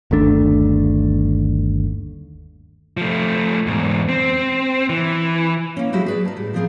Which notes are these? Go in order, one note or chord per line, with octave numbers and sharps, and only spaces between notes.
G1 D#2 A3 D4
F3 A3
E2 G#2
C4
E3
A#3 C#4
F#3 G#3 E4 F#4 G4
G#4 B4 D5
A#4 A5
A2 G3
E3 F3 B3 C4 G#4 A#4